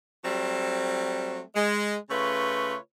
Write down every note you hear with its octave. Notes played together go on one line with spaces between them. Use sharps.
F#3 G3 A3 C4
G#3
C#3 A3 F4 B4 C#5